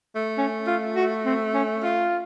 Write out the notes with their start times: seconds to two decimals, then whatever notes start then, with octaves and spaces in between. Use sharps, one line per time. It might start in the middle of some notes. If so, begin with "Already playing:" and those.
0.16 A3
0.38 C#4
0.67 F4
0.96 F#4
1.25 C4
1.54 C#4
1.83 F4